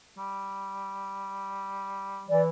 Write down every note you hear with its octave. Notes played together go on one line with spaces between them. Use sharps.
G3
E3 D5